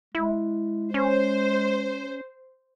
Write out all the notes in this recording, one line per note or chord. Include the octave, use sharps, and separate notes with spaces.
G#3 E4
C#4 C5